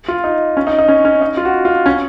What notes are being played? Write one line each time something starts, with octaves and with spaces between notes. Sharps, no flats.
F4
D#4
C#4
D#4
D#4
C#4
C#4
D#4
F4
F#4
F4
C#4